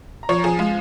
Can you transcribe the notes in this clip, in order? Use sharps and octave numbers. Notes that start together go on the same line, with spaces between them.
A#5
F3 C#5 C#6
A#5
F3 G#4 G#5
G#3 F4 F5